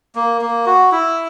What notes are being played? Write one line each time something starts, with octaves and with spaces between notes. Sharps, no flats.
A#3
A#3
F#4
E4